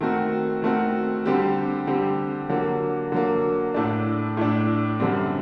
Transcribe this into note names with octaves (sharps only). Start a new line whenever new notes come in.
D#3 A3 C4 F#4
D#3 A3 C4 F#4
D3 G3 C4 G4
D3 G3 C4 G4
D3 F#3 A#3
D3 F#3 A#3
A2 A3 D4
A2 A3 D4
F#2 D3 G3 C4